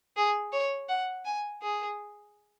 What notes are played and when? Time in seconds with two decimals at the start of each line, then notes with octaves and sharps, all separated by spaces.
0.17 G#4
0.52 C#5
0.89 F#5
1.25 G#5
1.62 G#4